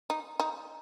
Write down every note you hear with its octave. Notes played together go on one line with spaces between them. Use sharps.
D#4
D#4